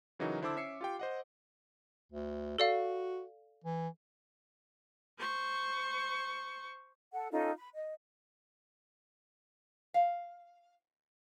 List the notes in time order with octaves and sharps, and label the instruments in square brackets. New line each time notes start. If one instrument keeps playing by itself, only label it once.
[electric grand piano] C#3 E3 F#3 D#4 F#4 A#4
D3 E4 C5 A5 D6 E6
C#4 E5 E6 C7 C#7
F4 G4 G5
C5 D#5 F#5
[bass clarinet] D2
[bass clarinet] F#4 [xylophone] A4 D5 F5
[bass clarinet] E3
[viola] C5 C#6
[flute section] A4 F#5
C#4 D#4 F4 A4
B5
D#5
[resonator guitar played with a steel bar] F5